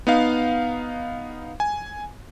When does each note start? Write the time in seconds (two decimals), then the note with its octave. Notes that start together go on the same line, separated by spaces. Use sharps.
0.07 B3 D#4 F5
1.60 G#5